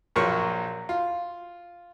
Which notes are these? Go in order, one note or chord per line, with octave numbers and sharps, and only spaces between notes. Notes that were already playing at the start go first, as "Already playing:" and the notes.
A#1 F3 F#3 A#3 A#4 C#6
F4